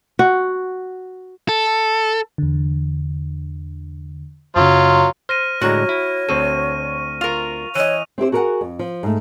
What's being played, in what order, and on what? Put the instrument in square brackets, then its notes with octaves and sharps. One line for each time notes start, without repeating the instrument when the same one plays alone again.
[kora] F#4
[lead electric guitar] A4
[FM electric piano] E2 D3
[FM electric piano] F#2 C#3 [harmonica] F#3 F4
[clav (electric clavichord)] C5 [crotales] F6 A#6 D#7
[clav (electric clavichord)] A2 D3 G#3 [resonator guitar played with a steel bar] F#4 A#5 [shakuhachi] C#5
[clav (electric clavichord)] E4
[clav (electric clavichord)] D2 C4 A4 [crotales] C#6 D#7
[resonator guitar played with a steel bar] F4 A#4 [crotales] F7
[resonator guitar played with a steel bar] E3 D#5 [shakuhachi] C#5 [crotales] D#7
[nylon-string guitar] C4 E4 G4 C5
F#4 G#4 A#4 B4 F#5 G#5
F2
F3
G#2 A3